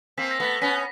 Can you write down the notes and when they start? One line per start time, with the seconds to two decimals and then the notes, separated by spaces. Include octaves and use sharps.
0.17 A#3 C4 B6
0.31 A#6
0.40 A3 B3 B6
0.61 B3 C#4 B6